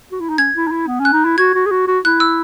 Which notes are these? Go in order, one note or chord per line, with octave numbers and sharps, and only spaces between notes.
F#4
E4
D#4
C#4 G#6
E4
D#4
E4
B3
C#4
F#6
D#4
E4
F#4 G#6
F#4
G#4
F#4
F#4
E4 F#6
E6